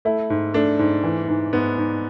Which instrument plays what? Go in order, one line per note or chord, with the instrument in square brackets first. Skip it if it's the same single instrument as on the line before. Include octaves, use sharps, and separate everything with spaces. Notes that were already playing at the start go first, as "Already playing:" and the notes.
[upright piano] A3 [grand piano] E4
[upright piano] G#2
[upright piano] A3 [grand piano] D4
[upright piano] G#2
E3
G#2
[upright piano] G#2 [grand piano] B3
[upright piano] G#2